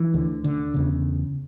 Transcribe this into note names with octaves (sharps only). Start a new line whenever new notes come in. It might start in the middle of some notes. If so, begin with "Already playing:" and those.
Already playing: E3
D2 D3
D3
E2 C#3